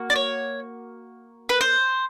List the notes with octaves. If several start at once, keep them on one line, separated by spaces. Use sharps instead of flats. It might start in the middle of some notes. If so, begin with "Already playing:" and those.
Already playing: A#3 F#4
D5
C#5
B4
C5